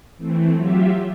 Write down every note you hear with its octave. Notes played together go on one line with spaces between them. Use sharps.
E3 A3 C4
F#3 F4 G4 E5